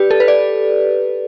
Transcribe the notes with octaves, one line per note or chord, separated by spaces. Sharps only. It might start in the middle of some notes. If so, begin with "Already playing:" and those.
Already playing: G4 B4 D5
A4
B4
D5